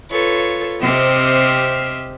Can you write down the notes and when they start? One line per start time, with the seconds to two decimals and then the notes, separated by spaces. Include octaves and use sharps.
0.11 F4 A4 B4 C#5
0.82 C3 C4 G4 D#5 E5 F6